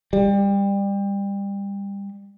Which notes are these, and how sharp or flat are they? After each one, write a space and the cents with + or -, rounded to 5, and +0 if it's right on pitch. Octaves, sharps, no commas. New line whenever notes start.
G3 +25